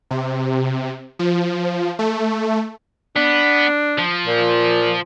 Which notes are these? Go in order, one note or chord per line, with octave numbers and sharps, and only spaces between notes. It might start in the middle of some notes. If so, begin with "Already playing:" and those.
C3
F3
A3
B3 D4
F3
A#2